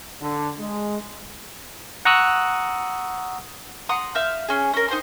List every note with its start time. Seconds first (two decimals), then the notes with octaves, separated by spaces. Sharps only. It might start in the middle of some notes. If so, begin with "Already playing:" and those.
0.21 D3
0.59 G#3
2.05 F#5 A#5 C#6 D#6 E6 F#6
3.89 F#5 A#5 C6 D#6
4.15 E5 F5 G6
4.48 C#4 G#4
4.74 C#4 A#4
4.88 D#4 C5 G5 C6